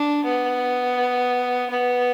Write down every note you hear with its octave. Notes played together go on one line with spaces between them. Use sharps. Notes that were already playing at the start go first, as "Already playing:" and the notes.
Already playing: D4
B3
B3